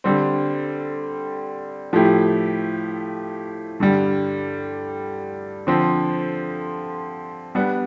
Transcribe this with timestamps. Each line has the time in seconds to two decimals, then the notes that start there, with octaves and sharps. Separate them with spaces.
0.04 D3 G3 C4
1.93 A2 F3 A3 E4 G4
3.80 G2 D3 G3
5.67 D3 F3 C4
7.55 G3 B3 D4